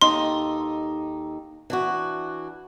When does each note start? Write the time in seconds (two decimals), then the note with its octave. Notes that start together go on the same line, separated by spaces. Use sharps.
0.01 D#2 D#4 A4 C6
1.70 E3 D4 F#4